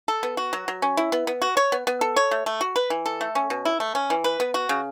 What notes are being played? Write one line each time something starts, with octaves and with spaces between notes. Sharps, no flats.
A4
B3
F#4
F#3
F#3
C#4
E4
B3
B3
F#4
C#5
B3
B3
A4
C#5
A3
A3
F#4
B4
E3
A4
A3
C#4
B2
E4
A3
C#4
E3
B4
B3
F#4
C#3